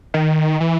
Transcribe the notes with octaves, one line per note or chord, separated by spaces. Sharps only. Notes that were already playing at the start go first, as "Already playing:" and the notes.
D#3
E3